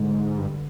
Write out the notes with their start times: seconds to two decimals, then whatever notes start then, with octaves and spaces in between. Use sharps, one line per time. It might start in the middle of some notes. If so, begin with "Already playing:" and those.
Already playing: G#2 D3
0.38 G2